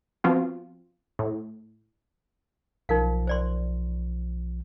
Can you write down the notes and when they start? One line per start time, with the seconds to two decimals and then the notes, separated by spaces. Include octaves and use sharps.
0.24 F3 B3 C4 F4 F#4
1.19 A2
2.89 B1 F3 D#4 A#4 F5
3.27 C5 D5 C6